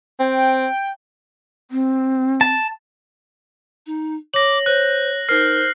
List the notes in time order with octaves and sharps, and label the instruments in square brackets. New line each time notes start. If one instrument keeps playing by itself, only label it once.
[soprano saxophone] C4 [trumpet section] G5
[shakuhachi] C4
[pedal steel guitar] A5
[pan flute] D#4
[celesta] C#5 [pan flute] D6 [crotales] A#6 F#7
[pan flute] C5 [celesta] C#5 [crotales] F#6
[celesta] D#4 A#4 [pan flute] C5 [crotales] F6 C7